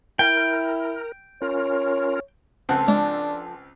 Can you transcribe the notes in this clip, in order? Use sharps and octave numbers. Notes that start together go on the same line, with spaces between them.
E4 A#4 G5
C#4 F4 A#4 C#5
C#2 F3 C4 A4 F#5
G#3 D4